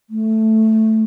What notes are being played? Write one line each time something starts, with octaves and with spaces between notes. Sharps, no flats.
A3